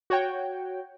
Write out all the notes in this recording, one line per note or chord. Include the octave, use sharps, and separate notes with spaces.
F#4 C#5 G5